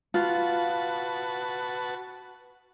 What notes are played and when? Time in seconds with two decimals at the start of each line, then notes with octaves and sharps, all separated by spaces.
0.14 F4 F#4 B4 A5